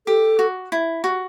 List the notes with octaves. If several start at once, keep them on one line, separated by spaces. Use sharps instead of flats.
G4 A4
F#4
E4
F#4